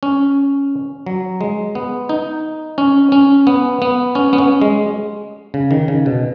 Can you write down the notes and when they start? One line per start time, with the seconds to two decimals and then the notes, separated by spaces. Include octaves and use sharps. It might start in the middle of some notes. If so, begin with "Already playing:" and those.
0.03 C#4
1.06 F#3
1.41 G#3
1.75 B3
2.09 D#4
2.78 C#4
3.12 C#4
3.47 B3
3.82 B3
4.15 C#4
4.33 B3
4.38 C#4
4.62 G#3
5.54 C#3
5.71 D#3
5.88 C#3
6.06 B2